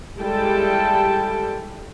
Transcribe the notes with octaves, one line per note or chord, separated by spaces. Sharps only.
G3 G#3 E4 A4 G5 A5